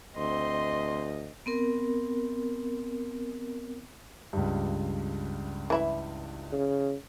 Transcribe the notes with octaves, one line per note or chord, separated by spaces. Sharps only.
D2 C4 D#5 C6
B3 C4 A#4
C#2 G2
E3 E4 E5
C#3